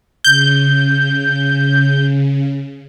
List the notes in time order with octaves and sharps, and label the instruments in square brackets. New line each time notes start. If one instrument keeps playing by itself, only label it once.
[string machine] C#3 [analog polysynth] G6